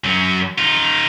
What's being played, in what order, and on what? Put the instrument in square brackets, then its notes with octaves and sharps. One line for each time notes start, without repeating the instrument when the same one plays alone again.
[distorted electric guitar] F#2 F#3
D#4 F4